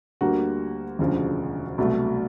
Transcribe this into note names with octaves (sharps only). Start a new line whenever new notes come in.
D2 D3 G3 A#3 F#4
E1 D2 C#3 F3
C2 B2 F#3 A3